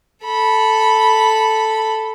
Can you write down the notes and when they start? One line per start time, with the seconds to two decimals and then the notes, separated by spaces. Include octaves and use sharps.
0.25 A4 B5